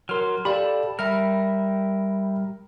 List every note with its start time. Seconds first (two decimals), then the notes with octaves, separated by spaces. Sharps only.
0.09 F#3 A#4 C6 F6
0.45 G4 A4 D5 F5 B5
0.99 G3 A#4 E5 B5 F6